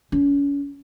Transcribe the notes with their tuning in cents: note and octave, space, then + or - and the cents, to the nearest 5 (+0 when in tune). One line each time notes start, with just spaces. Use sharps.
C#4 +35